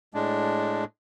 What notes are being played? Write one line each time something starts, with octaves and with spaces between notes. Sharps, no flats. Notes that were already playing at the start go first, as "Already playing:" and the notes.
A2 G#3 D4